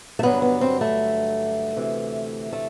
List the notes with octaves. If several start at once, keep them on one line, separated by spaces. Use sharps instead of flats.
A3
G2 D3 F#3 B3
B3
C4
A3
D2 C3 E3
A3